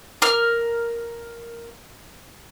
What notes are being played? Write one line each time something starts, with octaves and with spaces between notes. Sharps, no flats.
A#4 F6